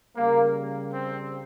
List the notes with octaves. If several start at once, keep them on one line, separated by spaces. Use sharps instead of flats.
C#3 G3 A#3
C4